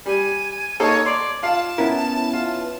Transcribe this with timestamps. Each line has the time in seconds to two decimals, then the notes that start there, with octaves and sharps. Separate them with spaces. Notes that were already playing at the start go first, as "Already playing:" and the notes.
0.06 G3 G#5
0.80 A#3 D#4 A4 C#5
1.06 D5 C6
1.43 F4 F5 A5
1.78 B3 C#4 E4 A#4
2.33 F4